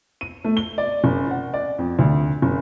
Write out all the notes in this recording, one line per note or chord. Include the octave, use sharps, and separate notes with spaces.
D#7
A3
G7
D5
F#1
F#5
D5
F2
D2
F#1